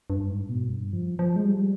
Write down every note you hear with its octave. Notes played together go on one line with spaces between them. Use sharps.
G2
G#2
B2
G2
F3
F3
G#3
G3